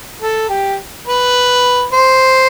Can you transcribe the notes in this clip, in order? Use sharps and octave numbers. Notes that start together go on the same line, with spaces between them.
A4
G4
B4
C5